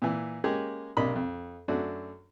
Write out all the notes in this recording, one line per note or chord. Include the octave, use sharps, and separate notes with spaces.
A#2 E3
G#3 A#3 C#4 G4 G#4
B1 C3 A#3 D4 D#5 B5
F2
F#2 A3 D4 F#4